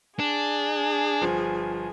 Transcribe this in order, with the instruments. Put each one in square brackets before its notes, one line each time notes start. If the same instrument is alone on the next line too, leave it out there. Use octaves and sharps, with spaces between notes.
[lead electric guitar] D4 [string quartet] G#4
[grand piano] G1 F3